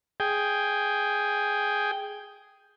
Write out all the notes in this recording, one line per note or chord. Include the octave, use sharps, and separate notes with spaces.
G#4 G5